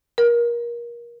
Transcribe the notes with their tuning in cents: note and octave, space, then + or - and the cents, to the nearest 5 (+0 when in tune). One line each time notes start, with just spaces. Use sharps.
A#4 +25